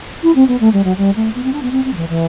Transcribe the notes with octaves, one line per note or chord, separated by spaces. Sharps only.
E4
C4
B3
A3
G3
F#3
G3
A3
B3
C4
D4
B3
C4
C4
F#3
E3
E3